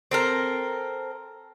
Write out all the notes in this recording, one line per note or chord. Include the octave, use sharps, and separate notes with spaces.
C4 A4 A#4